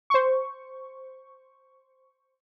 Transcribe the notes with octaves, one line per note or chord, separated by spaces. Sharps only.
C5 C#6